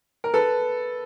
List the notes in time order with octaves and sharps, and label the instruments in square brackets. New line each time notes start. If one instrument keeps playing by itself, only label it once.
[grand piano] A#4
A4 B4